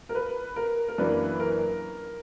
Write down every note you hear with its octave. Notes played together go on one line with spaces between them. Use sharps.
A#4
B4
A#4
A#4
F#2 E3 A#3 D4 B4
A#4